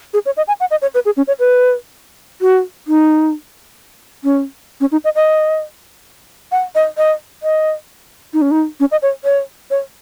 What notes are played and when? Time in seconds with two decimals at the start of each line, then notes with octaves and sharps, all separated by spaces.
0.14 G#4
0.26 C#5
0.37 D#5
0.48 G#5
0.60 F#5
0.71 D#5
0.82 C#5
0.94 B4
1.05 G#4
1.17 C#4
1.28 C#5
1.40 B4
2.41 F#4
2.88 D#4
4.24 C#4
4.81 C#4
4.92 D#4
5.04 D#5
5.15 D#5
6.52 F#5
6.75 D#5
6.97 D#5
7.43 D#5
8.33 D#4
8.42 C#4
8.51 D#4
8.80 C#4
8.91 D#5
9.02 C#5
9.24 C#5
9.71 C#5